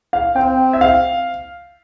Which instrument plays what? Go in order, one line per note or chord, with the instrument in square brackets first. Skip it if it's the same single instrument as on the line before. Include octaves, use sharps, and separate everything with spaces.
[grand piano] F5
[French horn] C4 [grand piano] G5
[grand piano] E5
F5